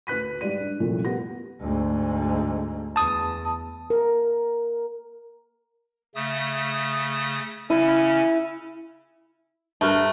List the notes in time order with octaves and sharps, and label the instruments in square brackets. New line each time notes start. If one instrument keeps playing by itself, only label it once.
[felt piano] D2 B4 F#6 B6 D#7
G#2 G3 G4 D5 D#7
D4
C2 F#2 A#2 E3 F3 A3
B3 G4 A#6
[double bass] D2 G#2
[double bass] E2 [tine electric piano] A5 D#6
[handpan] A#4
[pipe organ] C#3 A3 D#6
[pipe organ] C#3 C#4 G#5 [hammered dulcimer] E4
[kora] G2 F#4 A#4 [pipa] A3